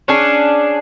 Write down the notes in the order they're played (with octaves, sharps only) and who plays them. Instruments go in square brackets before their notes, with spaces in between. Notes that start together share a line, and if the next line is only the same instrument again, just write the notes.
[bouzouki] C#4 D4 G#4